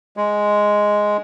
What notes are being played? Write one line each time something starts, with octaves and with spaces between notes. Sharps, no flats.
G#3